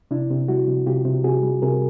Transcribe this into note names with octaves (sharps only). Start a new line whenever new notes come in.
C3 D4 E4
C3
G3 E4 F#4
C3
C3 F4 G4
C3
C3 F#4 G#4
G3
C3 G#4 A#4